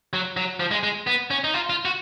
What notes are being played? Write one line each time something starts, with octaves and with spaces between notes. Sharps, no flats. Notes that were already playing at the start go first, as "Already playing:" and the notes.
F#3
F#3
F3
G#3
G#3
B3
C#4
D#4
F4
F4
F#4